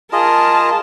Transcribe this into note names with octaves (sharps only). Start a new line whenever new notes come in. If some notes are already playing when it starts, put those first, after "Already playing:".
F4 G#4 A#4 D#5 A5